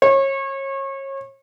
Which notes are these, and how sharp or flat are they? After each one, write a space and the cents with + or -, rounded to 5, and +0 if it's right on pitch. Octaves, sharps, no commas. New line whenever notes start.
C#5 -30